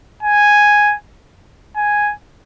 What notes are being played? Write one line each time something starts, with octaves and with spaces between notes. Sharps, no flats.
G#5
G#5